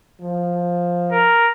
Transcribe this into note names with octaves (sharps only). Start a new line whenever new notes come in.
F3
A#4